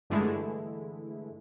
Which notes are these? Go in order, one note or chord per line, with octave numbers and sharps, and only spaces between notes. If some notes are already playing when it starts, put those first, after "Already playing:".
G2 D3 E3 G#3 A3 E4